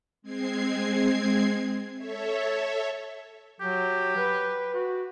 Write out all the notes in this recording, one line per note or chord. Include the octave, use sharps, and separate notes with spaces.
G#3 C4 G#6 C7
A4 C#5 E5
F#3 G4
B4
F#4